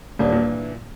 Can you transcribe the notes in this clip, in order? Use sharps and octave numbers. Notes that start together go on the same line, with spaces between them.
D#1 E3 A#3 D4
A#2